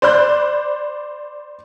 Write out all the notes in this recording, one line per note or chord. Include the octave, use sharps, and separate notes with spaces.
C5 D5 B5 F#6 G6